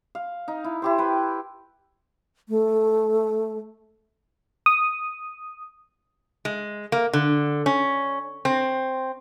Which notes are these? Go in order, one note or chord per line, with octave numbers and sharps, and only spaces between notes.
F5
D#4
E4
E4 G4 C5
B4 G5
A3
D#6
G#3
A#3
D3
C#4
C4